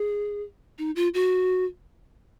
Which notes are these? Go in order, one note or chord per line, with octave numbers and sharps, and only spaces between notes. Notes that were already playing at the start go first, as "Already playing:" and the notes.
Already playing: G#4
D#4
F4
F#4